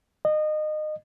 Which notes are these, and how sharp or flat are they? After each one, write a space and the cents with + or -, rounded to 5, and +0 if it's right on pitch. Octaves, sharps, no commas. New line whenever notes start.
D#5 -25